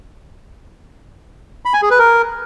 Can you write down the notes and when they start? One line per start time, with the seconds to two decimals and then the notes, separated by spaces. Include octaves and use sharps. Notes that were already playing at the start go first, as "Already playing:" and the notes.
1.65 B5
1.74 G#5
1.82 G#4
1.90 B4
1.99 A#4